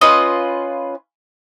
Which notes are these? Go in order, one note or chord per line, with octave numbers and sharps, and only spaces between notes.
C#4 F4 B4 D#5